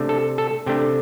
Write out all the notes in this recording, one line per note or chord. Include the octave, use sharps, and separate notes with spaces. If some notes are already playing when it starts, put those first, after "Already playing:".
Already playing: C3 A3 D4
A4
A4
C3 A3 D4 G5